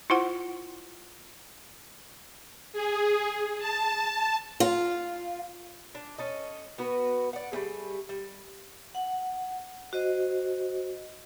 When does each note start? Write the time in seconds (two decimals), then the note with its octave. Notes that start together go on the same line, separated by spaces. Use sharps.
0.10 E4 F4 C5 F#5
2.73 G#4
3.59 A5
4.60 F4
5.95 D4
6.18 C#4 A4 D#5
6.78 B3 F#4 B4
7.33 D5 F#5
7.52 G3 A3 C#4 G#4
8.09 G3
8.95 F#5
9.93 F#4 C5 D#5